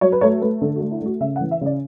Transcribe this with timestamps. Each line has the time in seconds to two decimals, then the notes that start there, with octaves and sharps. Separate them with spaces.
0.01 F#3 C#5
0.12 B4
0.21 A3 C#5
0.42 A3 B4
0.61 D3 A4
0.76 F#4
0.81 A3
0.91 E4
1.02 A3 F#4
1.21 C#3 E5
1.36 F#5
1.41 E3
1.51 E5
1.61 C#3 D5